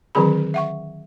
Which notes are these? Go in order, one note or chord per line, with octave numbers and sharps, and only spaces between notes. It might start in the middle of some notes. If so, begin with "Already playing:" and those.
D3 D#3 F#3 C4 G#4 B5
E5 F#5 C#6